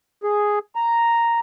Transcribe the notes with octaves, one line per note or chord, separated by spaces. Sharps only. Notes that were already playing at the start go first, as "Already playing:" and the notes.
G#4
A#5